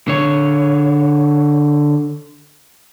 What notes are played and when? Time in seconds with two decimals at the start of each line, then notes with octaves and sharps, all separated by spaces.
0.08 D3 C#5